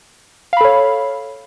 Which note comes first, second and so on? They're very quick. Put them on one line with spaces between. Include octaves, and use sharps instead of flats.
F5 B5 A4 C#5